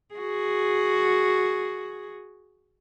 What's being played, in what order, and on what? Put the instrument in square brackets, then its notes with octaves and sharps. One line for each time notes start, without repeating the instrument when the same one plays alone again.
[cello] F#4 G#4